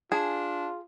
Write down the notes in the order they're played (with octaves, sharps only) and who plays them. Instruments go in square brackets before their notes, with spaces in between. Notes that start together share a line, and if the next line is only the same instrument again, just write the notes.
[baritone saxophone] D4 [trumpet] F4 [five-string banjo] G#4 [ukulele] G#5 A5